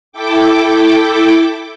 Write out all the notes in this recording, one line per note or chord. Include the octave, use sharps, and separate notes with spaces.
E4 A4 G5 D6